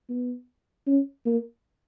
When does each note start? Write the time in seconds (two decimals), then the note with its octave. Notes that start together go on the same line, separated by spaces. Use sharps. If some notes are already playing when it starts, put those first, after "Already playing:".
0.10 B3
0.87 C#4
1.26 A#3